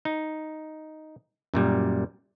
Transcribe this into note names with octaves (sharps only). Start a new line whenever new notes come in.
D#4
F#2 A#2 G3